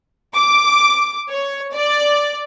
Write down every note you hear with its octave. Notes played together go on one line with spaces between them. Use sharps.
D6
C#5
D5